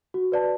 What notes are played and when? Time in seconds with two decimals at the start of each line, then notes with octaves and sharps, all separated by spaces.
0.14 F#4
0.32 B4 D5 A5